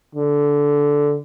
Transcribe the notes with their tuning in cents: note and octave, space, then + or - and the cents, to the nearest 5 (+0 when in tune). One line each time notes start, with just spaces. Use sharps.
D3 -10